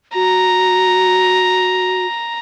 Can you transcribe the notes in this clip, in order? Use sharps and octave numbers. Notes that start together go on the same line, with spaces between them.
F#4 A#5